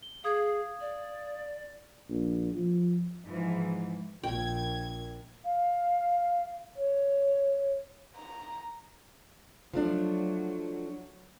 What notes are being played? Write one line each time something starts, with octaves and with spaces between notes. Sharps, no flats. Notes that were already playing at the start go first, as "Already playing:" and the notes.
G7
G#4 F5 D#6 G#6
D5
A#1
F3
G#2 E3 F3
A#1 G5 G#6
F5
C#5
A#5
F3 F#3 A3 D4